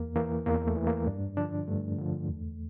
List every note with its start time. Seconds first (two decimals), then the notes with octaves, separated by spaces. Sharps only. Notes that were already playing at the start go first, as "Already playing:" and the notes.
Already playing: E2 A#3
0.16 E3 A#3
0.46 E2 A#3
0.67 A3
0.77 E3
0.87 A#3
1.07 G2 D4
1.37 D3 F3 D4
1.68 G2 A3
1.98 D3 F3
2.28 E2